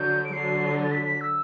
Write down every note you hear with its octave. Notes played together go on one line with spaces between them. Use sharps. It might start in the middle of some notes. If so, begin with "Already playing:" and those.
Already playing: D3 F#3 G6
D7
D3 F#3 C7
A6
B6
B6
E6